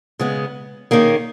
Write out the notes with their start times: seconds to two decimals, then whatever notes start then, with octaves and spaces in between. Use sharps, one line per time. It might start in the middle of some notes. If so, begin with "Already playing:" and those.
0.19 C#3 G#3 B3
0.91 D#3 A#3 C#4 G#4